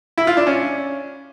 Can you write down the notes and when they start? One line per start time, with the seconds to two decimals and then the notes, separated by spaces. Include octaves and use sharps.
0.18 E4
0.27 F4
0.37 D4
0.47 C#4